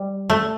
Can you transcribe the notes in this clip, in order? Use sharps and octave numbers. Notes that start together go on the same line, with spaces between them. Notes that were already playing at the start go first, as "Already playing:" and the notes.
Already playing: G3
A3